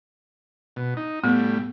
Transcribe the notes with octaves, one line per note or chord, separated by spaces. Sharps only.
B2
D#4
A2 G3 B3